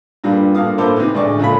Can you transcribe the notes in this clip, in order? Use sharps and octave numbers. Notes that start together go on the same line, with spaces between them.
G2 A#2 D3 G3
G2 A#2 D3 F5 D#6
A2 D3 A#3 A4 C5 D6
C3 D#3 E3
A1 D2 G#3 D5 C#6
C#2 A#2 A3 C#5 B5